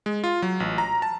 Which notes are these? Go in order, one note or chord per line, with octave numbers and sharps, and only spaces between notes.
G#3
F4
F#3
A1
A#5
A5